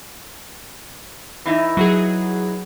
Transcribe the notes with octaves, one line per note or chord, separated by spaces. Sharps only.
E3 D#4 E4
F#3 F#4 G#4